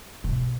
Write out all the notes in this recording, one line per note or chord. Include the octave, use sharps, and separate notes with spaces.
C3
B2